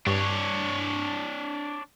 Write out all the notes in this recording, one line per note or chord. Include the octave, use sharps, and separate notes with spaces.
G2 D4 C#5